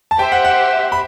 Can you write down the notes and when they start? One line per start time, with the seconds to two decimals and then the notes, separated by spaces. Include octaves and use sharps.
0.11 A5
0.19 G4 C5 E5 G5
0.32 F#5
0.45 F#5
0.92 B5